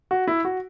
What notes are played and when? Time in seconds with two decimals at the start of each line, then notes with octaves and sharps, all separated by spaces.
0.11 F#4
0.27 E4
0.45 F#4